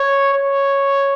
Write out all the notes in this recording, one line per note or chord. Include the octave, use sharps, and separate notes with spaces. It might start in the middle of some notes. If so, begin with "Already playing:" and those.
Already playing: C#5
C#5